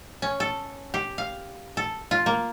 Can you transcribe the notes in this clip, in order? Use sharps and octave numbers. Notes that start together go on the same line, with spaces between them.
C#4
A4
G4
F5
A4
F4
A#3